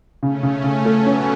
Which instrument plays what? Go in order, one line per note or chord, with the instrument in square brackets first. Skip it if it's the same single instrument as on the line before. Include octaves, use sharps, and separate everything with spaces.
[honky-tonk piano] C#3 [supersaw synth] A3 C#4
[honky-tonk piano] C#3
C#3
[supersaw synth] F#3 B3 [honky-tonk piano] A3
[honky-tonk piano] C#4